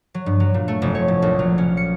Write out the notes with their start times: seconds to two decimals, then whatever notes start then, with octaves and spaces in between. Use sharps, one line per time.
0.14 F#3
0.26 G2
0.40 F#3
0.54 A#2
0.68 A3
0.82 F1
0.95 C#5
1.08 A2
1.22 A#1
1.39 F#3
1.58 C#4
1.77 C#7